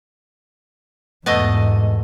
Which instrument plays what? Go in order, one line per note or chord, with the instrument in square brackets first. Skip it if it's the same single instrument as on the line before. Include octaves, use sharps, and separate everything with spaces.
[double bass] E2 G#2 [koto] B2 A3 D#5